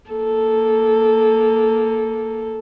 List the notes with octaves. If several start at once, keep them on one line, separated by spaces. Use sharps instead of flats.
A#3 A4